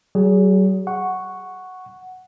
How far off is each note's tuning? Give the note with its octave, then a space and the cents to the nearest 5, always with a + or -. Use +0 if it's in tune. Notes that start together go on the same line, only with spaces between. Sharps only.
F#3 +40 G#4 +0
F#5 +0 C#6 +0